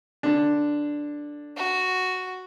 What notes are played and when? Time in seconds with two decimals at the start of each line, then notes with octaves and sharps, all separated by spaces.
0.23 D3 D4
1.57 F#4